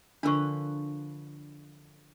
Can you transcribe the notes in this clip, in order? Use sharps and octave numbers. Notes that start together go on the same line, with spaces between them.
D3 F3 D4 A#4 B4 C#6